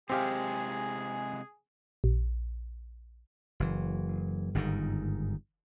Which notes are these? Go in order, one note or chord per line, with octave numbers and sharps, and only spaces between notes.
C3 G#3 C4 G4 G#4 F5
A#1
F#1 E3
G1 G#2 B2 D#3